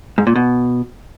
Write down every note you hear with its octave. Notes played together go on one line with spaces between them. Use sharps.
G#2
A#2
B2